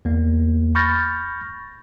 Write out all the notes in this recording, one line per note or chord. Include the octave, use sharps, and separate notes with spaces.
E2 A#3
B5 C#6 F6 G6 A6 A#6